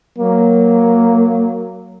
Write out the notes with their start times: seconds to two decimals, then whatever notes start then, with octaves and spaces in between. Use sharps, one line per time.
0.18 F#3 A#3